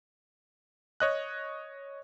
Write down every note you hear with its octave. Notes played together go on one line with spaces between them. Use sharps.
C#5 D#5 F#6